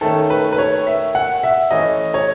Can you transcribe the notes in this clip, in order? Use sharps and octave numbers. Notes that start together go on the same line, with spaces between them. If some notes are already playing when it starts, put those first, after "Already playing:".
D#3 A3 C#4 A4
B4
B4
C#5
E5
F#5
E5
E3 A3 C#4 D#5
C#5